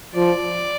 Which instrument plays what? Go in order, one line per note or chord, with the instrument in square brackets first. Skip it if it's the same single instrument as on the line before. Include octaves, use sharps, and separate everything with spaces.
[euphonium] F3 [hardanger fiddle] D5